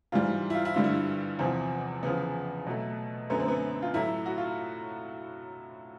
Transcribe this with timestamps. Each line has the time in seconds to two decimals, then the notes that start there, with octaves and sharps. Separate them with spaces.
0.12 G#2 E3 G3 F4
0.50 E4
0.55 F4
0.65 E4
0.74 G2 D3 G3 F4
0.84 E4
1.39 E2 C3 F3 C4
2.03 E2 C#3 F3 B3
2.66 B2 F#3 A3
3.30 F#2 D3 F#3 A3 B3
3.40 C4
3.48 B3
3.82 F4
3.94 A2 F#3 A3 E4
4.26 F#4
4.38 F4